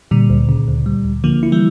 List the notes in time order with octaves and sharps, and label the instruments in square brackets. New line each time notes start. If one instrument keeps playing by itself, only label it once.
[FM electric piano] A#2 D3 [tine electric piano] G3
[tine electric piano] D2
C#3
D2
G3
D2
[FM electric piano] D3 F3 [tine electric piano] A#3
[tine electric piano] E4
[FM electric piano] E3 G3